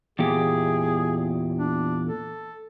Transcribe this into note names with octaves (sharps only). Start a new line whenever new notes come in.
E2 A#2 G4 G#4
D4
A4